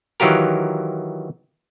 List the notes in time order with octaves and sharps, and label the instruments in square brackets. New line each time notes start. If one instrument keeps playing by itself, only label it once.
[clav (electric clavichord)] D#3 E3 F#3 F4 G4 A#4